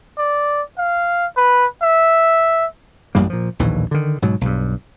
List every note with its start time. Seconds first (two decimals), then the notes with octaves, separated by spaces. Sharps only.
0.18 D5
0.78 F5
1.37 B4
1.82 E5
3.15 A1 F#2 G3 A#3
3.30 A#2 F3
3.59 A#1 D#2 A2 E3
3.91 D3 D#3
4.22 G#2 B2 F#3
4.41 B1 G2